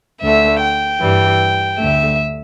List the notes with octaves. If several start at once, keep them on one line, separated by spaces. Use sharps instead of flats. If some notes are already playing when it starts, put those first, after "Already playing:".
D2 D3 A3 E5
G5
G2 E3 G3
D2 D3 A3 E5